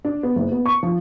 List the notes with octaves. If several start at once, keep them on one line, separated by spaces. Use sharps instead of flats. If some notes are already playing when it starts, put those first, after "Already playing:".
D4
B3
F#1
B3
C#6
F3